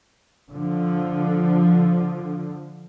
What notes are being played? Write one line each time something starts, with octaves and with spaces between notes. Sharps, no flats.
D3 F3